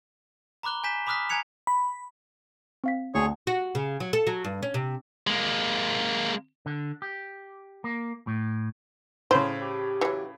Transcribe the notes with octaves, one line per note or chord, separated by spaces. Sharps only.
A#5 B5 D6 F#6 G7
G#5 G6 B6 E7
B5 D6 D#6 F6 F#6 B6
G#5 A#5 F#6 G#6 C#7 F7
B5
C4 F5 B6
D2 G#4 C#5 C#6
F#4
C#3
F#3
A4
F#3
G2
C#4
C3
G#3 A#3
D3
G4
A#3
A2
A2 C#3 C5
G4
E3 F#3